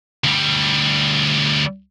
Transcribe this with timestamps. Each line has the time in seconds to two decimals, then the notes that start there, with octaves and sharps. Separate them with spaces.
0.24 D2 G3